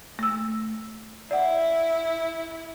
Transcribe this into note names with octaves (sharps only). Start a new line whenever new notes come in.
A3 E6
E4 D5 F#5